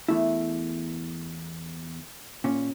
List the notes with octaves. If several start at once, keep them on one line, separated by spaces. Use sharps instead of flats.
E2 A3 E4
A#2 C#4